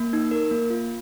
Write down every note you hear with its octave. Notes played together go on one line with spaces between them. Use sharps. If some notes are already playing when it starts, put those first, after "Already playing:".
Already playing: A#3
D#4
A#4
A#3
F4